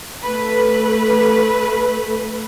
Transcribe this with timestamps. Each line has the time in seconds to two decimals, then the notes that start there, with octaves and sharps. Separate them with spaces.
0.23 A3 B4